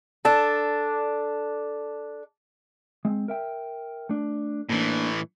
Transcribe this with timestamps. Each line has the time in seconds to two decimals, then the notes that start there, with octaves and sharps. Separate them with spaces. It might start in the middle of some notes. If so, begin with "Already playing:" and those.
0.25 D4 A4
3.05 G#3 C4
3.28 A#4 E5 G5
4.09 A3 D4
4.69 A2 E3 A#3 D4